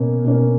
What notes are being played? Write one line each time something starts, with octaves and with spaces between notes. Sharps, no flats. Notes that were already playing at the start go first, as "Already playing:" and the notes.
Already playing: B2 A#3 C#4
B2 A#3 C#4